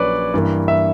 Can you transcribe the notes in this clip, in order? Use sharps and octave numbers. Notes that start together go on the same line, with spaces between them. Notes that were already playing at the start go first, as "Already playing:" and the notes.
Already playing: A#1 A#2 F#3 C#4 B4 C#5 D5
G2 E3 A#3
E5